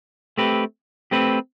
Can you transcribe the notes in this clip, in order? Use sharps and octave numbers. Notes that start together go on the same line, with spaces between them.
A3 C4 G4 B4
A3 C4 G4 B4